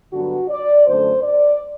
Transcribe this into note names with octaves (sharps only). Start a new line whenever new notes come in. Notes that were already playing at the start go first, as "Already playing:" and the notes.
G2 D3 F#3 B3 F#4
D5
F#2 D3 A3 C5
D5